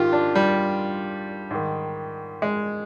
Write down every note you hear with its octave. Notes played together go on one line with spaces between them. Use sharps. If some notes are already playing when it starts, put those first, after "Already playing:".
Already playing: G#2 D#3 F4 G4
D4
G3
G#2 D#3
G#3